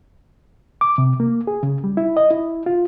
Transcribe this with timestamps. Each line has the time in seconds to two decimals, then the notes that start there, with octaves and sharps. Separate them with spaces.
0.81 D6
0.98 C3
1.20 A#3
1.47 G#4
1.63 C#3
1.84 G3
1.97 E4
2.17 D#5
2.31 E4
2.66 F4